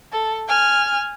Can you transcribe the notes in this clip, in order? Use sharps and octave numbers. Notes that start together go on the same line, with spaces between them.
A4
G#5 F6